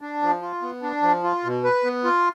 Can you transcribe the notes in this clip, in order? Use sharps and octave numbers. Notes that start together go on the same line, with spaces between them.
D4
F3
F4
B3
D4
F3
F4
B2
B4
B3
F4